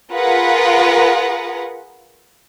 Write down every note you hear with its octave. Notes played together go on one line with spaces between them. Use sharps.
F4 G#4 A#4 B4 F#5